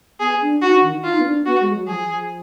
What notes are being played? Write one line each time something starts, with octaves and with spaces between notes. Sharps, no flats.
B3 G#4
D4
D#4 F#4
D4
D#3
D#4 F4
B3
D4
B3 F#4
G#3
F#3
F3 G#4
F3